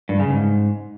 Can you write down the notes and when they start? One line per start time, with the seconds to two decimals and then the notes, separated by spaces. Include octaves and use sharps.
0.09 G2
0.20 C#3
0.30 G#2